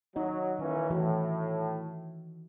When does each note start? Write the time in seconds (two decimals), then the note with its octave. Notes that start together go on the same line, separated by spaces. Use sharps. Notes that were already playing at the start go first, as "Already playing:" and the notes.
0.16 F#3 D#4 D#5
0.59 D#3 E3 A#3 C#4
0.90 A2 E3 F#4